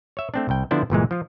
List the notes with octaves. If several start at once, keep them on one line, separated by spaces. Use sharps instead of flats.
C#5 E5
A3 C4 D4
C2 G5
D3 F3 B3 D4 E4 C5
G1 A#2 E3 G#3
F3 F4